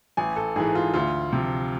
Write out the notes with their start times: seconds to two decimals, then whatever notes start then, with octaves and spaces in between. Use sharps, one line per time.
0.17 A1 G#5
0.36 A4
0.56 G#2 E3 G#4
0.75 F4
0.94 D2 F4
1.33 C3 F3